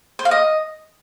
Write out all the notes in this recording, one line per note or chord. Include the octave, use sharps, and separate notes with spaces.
C5
F5
D#5